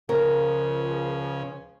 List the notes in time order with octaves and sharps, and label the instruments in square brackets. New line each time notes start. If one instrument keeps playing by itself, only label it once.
[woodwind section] C#2 F3 [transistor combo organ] C#3 C#4 [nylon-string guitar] A#4